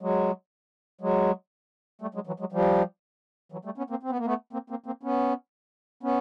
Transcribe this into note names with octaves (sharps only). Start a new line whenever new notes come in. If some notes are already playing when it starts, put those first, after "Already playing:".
F#3 G#3
F#3 G#3
G3 A3
F#3 G#3
E3 F#3
F#3 G#3
F3 G3
E3 F#3
G3 A3
B3 C#4
A#3 C4
C4
B3
A#3
A3 B3
A#3 C4
A#3 C4
A#3 C4
B3 C#4
B3 C#4